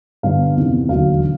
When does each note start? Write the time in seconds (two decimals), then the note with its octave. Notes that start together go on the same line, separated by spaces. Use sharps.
0.23 G2 D3 G3 B3 F5
0.56 E2 C3 D#3 G3
0.89 E1 D#2 D3 F#3 F5